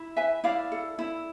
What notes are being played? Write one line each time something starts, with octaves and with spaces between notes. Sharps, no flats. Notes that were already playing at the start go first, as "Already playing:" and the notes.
Already playing: E4
B4 E5 G#5
E4 D5 F5
A4
E4